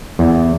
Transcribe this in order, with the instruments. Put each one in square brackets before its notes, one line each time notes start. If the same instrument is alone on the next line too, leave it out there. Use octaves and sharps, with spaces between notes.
[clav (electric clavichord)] E2